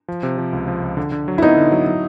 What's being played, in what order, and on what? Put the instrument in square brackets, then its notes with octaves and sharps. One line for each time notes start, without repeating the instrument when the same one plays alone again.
[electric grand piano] F3
C3
F3
C#2
F3
C#2
D3
D3
F#3
[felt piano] E4
[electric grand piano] B3 [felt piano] D#4
[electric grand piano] D3
F#3
F#3